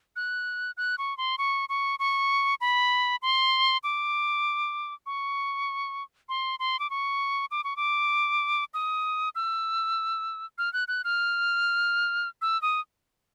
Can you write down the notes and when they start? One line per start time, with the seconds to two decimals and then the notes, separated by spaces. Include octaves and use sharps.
0.16 F#6
0.77 F#6
0.98 C#6
1.17 C6
1.38 C#6
1.69 C#6
1.99 C#6
2.61 B5
3.22 C6
3.84 D6
5.06 C#6
6.29 C6
6.60 C6
6.79 D6
6.90 C#6
7.51 D6
7.64 C#6
7.77 D6
8.74 D#6
9.35 E6
10.58 F6
10.73 F#6
10.88 F#6
11.04 F6
12.42 E6
12.62 D#6